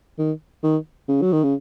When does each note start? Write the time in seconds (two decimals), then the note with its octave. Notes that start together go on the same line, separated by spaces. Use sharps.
0.18 D#3
0.63 D#3
1.08 C#3
1.22 F#3
1.33 D#3
1.43 C#3